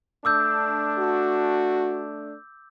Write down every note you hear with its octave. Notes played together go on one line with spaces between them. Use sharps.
A3 D4 D6 E6 G6
F#4